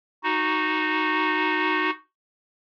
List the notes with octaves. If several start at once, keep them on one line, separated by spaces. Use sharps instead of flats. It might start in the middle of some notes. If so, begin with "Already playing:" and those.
D#4 F#4